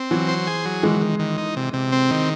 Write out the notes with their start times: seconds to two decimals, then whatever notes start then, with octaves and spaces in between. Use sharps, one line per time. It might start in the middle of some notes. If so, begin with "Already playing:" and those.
Already playing: C4
0.11 E3 F#3
0.28 C5
0.47 G#4
0.65 F#3
0.83 D#3 E3 G#3
1.01 D#3
1.19 D#3
1.38 D#4
1.56 C3
1.73 C3
1.92 C4
2.11 D#3